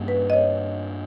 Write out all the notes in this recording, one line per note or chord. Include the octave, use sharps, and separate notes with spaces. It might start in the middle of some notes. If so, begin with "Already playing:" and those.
Already playing: G2 G3 A#3 C#4
B4
D#5
C#5